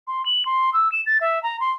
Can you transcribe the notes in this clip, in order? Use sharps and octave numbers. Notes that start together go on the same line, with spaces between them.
C6
F#7
C6
E6
E7
A6
E5
A#5
C6